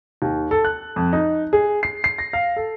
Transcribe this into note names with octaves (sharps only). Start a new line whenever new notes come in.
D#2
A4
F#6
F2
D#4
G#4
C7
C7
A#6
F5
A4